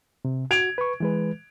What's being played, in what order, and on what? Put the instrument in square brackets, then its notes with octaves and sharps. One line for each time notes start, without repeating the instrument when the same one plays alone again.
[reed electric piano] C3
[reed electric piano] F#4 [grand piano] G#6 D7 F7
[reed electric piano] B4 C#6
E3 G#3 B4